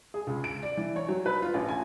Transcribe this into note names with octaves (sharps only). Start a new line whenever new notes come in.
G#4
C#2
D7
D5
E3
C#5
F#3
B4
F4
A1
G#5